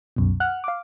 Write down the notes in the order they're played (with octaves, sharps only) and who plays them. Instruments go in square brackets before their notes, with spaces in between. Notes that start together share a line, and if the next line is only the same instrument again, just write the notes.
[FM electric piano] C2 F#2 B2
F#5 F6 F#6
F5 D6